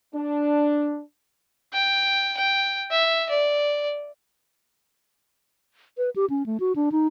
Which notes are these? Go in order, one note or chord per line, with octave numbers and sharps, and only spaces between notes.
D4
G5
G5
E5
D5
B4
G4
C#4
A3
F#4
D4
D#4